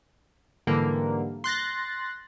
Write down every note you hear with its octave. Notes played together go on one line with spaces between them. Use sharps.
G#2 D3 E3 G3 A#3
C6 F#6 A6 A#6